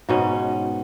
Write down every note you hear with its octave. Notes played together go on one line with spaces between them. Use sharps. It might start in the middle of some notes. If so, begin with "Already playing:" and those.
G#2 B2 C#4